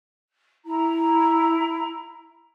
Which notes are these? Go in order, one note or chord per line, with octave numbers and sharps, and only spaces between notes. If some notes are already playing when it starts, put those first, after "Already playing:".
E4 A#5